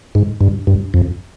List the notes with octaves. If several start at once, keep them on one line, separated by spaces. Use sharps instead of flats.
G#2
G2
G2
F2